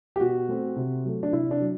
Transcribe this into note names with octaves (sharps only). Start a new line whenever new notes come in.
G4
B2 F#4
A3 C4
C3
F#3 A3
D4
C3 E4
D4
F#3